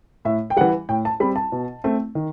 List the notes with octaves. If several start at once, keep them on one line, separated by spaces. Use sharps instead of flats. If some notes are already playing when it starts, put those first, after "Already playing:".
A2 E5
G5
E3 G3 F#5
A2 G5
A5
G3 C4 B5
A5
B2
A3 C4
D#3